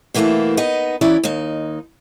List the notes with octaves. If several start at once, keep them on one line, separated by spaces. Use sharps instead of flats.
B2 E3 A3 A#3 E4 A4
B3 D#4 D#5
E3 C#4 E4 D5
D#2 D#4